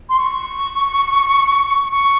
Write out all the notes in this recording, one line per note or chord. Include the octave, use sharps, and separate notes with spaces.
C6
C#6
C#6